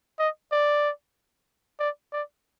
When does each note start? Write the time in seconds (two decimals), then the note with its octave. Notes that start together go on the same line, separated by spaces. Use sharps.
0.19 D#5
0.52 D5
1.80 D5
2.12 D5